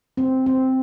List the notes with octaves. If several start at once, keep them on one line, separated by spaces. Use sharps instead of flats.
C4
C4